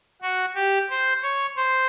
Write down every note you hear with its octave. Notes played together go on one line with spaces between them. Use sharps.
F#4
G4
C5
C#5
C5